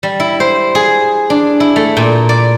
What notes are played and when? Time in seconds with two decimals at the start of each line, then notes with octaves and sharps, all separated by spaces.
0.03 G3
0.20 E4
0.40 C5
0.75 G#4
1.30 D4
1.60 E4
1.76 A3
1.97 A#2
2.29 D5